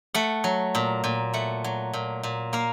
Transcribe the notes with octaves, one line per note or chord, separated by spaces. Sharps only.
A3 F#5
F#3
A#2
A#2
A3 F#5
F#3
A#2
A#2
A#3 F5